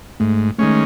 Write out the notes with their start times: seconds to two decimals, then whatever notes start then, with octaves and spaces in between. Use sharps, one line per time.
0.20 G#2 A3
0.59 D#3 G#3 A3 C#4